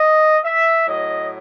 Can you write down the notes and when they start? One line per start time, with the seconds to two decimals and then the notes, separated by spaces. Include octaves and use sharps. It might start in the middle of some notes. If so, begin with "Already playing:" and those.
Already playing: D#5
0.45 E5
0.87 A2 F#3 D#5